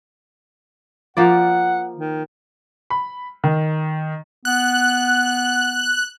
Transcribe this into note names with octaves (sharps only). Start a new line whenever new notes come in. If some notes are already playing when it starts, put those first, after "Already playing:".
F3 A#3 D5 F#5
D#3
B5
D#3
B3 F#6